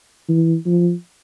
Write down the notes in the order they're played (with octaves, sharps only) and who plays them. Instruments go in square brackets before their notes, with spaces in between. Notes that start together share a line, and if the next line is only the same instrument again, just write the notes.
[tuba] E3
F3